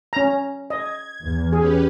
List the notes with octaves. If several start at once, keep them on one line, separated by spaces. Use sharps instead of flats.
C#4 A#5
D#5 G#6
E2
C#4 G4 G#4 B4